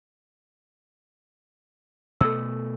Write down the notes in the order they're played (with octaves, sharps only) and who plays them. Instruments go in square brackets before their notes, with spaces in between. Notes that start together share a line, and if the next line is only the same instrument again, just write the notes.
[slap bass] B2 A3 [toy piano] A4 E6